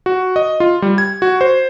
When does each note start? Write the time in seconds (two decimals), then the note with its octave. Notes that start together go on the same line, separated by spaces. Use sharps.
0.06 F#4
0.36 D#5
0.60 F4
0.82 G3
0.98 G#6
1.22 F#4
1.41 C5